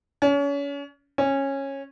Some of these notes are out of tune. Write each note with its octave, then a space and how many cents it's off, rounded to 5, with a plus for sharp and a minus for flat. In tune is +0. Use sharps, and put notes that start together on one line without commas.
C#4 +35
C#4 -15